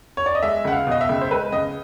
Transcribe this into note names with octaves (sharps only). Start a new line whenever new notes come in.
C#5
D5
D#5
G#3 E5
C#2 F#5
F5
B2 D#5
E5
C#2
C5
G#3 B4
C#2 D#5